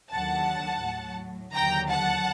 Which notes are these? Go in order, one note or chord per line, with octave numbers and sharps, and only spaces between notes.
D#2 D3 F#3 F#5 A5
A2 F#3
D#2 D3 F#3 G5 A#5
F#5 A5